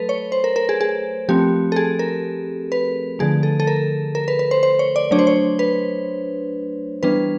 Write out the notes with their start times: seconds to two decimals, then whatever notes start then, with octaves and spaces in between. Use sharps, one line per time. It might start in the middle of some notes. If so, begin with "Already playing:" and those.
Already playing: F#3 A3 A4 B4
0.09 C#5
0.32 C5
0.44 A#4
0.56 A#4
0.69 G#4
0.81 G#4
1.29 F3 A3 C4 G4
1.72 A4
1.76 G#4
1.99 A#4
2.72 B4
3.19 D3 F3 A3 G#4
3.43 A4
3.60 A4
3.67 A#4
4.15 A#4
4.28 B4
4.39 B4
4.51 C5
4.63 C5
4.79 C#5
4.96 D5
5.11 F#3 A3 D4 C#5
5.19 C5
5.27 C#5
5.59 B4
7.03 E3 G3 B3 D4 B4